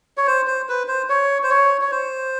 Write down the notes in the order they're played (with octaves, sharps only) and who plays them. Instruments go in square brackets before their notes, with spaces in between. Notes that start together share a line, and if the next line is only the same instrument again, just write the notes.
[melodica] C#5
C5
C5
B4
C5
C#5
C5
C#5
C#5
C5